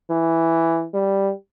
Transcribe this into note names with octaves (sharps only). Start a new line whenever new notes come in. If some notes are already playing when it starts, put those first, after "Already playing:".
E3
G3